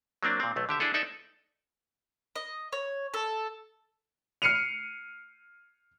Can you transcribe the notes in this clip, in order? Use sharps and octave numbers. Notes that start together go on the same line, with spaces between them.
F#3 A#3 C4 D4
A#2 C4
B1 A3
D3 G4 E5
D4 E4 G#4 A4
D#4 A4 D5 E5
D#5
C#5
A4
F6 C7 C#7 D#7 F7